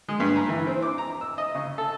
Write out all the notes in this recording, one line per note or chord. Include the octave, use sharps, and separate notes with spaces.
G#3
G2
A#5
E3
C4
D6
A#5
E6
D#5
C#3
A4